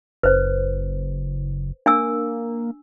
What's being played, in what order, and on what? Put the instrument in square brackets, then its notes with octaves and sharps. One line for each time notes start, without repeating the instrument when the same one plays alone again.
[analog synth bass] F#1 [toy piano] B4 C5
[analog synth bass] A#3 [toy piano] D4 G#5 E6